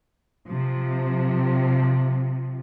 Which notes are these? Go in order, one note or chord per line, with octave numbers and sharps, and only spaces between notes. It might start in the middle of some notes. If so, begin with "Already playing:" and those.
C3 F3